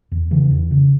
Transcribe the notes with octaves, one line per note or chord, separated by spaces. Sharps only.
E2
C#3 E3
E2
C#3